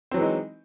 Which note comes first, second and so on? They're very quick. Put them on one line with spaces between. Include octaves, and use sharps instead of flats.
C4 F#3 E3 G#3 D#4